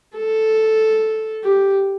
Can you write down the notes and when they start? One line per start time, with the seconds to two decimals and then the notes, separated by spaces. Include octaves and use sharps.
0.17 A4
1.44 G4